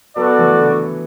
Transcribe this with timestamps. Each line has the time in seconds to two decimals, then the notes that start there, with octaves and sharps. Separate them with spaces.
0.16 F#3 B3 F#4 A4 D5
0.38 E3 A3
0.61 D3 F#3